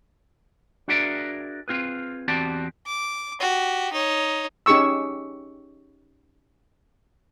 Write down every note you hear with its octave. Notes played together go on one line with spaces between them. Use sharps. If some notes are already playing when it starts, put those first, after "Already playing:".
D4 F#4 G#4 A#4 D5 E5
C4 F4 G#4 B4
E2 C4 F#4 G4 D5 A5
D6
F#4 G4
D#4 C#5
C#4 D#4 G4 G#4 C#6 E6